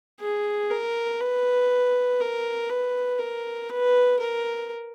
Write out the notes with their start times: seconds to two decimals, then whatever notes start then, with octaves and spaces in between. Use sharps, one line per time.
0.21 G#4
0.70 A#4
1.21 B4
2.20 A#4
2.69 B4
3.19 A#4
3.70 B4
4.20 A#4